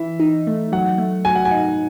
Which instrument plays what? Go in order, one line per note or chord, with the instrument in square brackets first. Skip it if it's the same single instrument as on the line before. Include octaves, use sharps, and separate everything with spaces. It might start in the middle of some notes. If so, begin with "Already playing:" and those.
Already playing: [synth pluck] E3 [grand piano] E5
[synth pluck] D#4
A3
[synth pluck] F#3 [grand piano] F#5
[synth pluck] A3
[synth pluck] F#4 [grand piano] G#5
[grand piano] F#5
G#5
[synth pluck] D#4